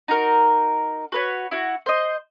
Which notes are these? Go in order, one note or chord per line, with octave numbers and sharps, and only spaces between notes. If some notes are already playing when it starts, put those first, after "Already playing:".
D#4 F#4 A#4
F#4 B4 C#5
E4 F#4
C5 D#5